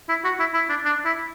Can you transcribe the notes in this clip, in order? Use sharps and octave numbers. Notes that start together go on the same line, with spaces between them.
E4
F#4
E4
E4
D4
D4
E4